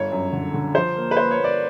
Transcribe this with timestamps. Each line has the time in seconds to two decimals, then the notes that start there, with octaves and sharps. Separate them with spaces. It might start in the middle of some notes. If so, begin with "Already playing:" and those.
Already playing: G1 C#5
0.12 F#2
0.33 D3
0.54 D3
0.75 F3 C5
0.96 A#3
1.11 B4
1.16 A#3 C5
1.31 C#5
1.38 A#3
1.44 D5